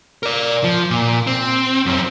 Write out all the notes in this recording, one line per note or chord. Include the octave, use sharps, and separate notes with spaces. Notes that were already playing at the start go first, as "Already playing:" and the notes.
A#4 D5
F3
A#2
C4
F#2 C4